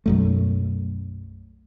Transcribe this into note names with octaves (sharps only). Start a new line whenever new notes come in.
B1 F#2 A3